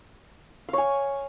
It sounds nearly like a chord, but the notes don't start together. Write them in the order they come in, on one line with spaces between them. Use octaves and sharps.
F5 C#5 G#5